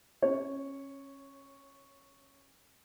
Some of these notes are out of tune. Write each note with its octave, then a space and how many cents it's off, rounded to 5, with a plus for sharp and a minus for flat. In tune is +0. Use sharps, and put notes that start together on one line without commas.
C#4 -20 C#5 +0